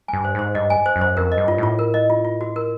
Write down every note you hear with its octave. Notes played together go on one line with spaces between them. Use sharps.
G2 G#5
C5
G#2 C5
G2 D#5
G#5
C5
F#2
C5
F2 A#4
D#5
G2
F4
A2 F4
A#4
D#5
F4
F4
F#4
A#4